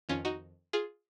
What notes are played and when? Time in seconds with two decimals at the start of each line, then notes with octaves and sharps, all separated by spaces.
0.09 F2 D#3 C#4 F4
0.25 D#4 F#4
0.73 F4 G#4